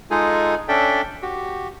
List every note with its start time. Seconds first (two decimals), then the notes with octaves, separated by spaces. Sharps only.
0.11 G#3 D#4 F4 G#4 A4 G#5
0.68 C#4 D4 A4 D5 E5 G5
1.22 F#4 G4